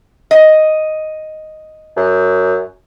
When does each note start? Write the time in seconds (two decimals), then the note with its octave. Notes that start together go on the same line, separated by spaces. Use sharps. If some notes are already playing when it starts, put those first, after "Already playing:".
0.31 D#5
1.96 F#2